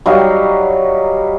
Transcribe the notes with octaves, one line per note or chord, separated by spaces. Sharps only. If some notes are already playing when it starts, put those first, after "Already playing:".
F#3 G3 D#4 F5